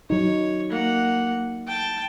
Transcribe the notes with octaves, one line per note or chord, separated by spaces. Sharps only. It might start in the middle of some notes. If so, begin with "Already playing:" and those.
F#3 D#4 C#5
A#3 F#5
G5 A5